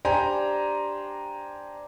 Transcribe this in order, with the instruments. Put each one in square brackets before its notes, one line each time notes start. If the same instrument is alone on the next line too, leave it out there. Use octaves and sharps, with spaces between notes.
[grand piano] D4 G4 C5 G#5 A#5